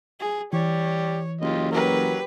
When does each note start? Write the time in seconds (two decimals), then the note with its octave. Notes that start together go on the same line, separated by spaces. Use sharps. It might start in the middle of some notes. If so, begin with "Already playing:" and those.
0.20 G#4
0.53 E3 G4 C#5 D5
1.41 F#1 F4 G4 D#5
1.72 F#3 G4 A#4 B4